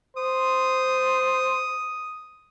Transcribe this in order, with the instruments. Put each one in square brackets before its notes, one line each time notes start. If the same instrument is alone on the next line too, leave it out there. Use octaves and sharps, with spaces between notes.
[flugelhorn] C5 [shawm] D#6